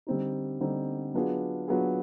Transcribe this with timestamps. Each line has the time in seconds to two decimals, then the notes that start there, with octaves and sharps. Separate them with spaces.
0.07 D3 G3 C4 D#4
0.61 D3 G3 C4 D#4
1.14 F#3 B3 D4 F4 G#4
1.68 F#3 B3 D4 F4 G#4